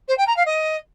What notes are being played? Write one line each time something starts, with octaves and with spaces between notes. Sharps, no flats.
C5
G5
A#5
F5
D#5